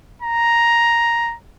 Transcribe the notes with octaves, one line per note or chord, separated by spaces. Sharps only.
A#5